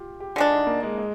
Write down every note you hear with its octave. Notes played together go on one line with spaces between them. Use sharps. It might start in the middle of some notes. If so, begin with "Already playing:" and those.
Already playing: F4 G4
G4
D3 G#3 D4 F4
D#4
A#3
G#3
G#3